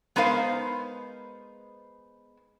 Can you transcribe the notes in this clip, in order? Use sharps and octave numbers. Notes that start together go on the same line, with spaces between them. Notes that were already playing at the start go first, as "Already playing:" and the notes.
G#3 B3 D#4 A#4 C5 F5